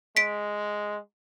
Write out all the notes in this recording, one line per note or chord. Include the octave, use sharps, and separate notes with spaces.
G#3 B6 D7